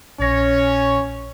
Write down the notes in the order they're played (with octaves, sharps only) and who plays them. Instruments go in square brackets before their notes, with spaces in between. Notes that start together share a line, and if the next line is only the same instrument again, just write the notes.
[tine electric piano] A#1 A#2 A#6 [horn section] C#4 C#5